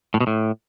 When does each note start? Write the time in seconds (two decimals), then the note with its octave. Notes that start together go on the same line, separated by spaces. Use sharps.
0.14 A2
0.20 B2
0.27 A2